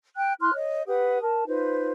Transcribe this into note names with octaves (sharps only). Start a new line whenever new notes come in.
G5 F#6
E4 C6 F6 F#6
C#5 D#5
G4 B4 F#5 D#6
A#4 A5
D#4 F4 B4 C5